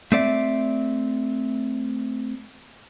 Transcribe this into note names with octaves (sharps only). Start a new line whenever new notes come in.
A3 C4 D5 E5